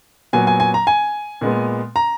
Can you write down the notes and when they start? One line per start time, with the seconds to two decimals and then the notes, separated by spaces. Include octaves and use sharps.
0.33 A#2 F#3 B3 G#5
0.47 G#5
0.60 G#5
0.74 A#5
0.87 G#5
1.41 A#2 G#3 B3
1.96 A#5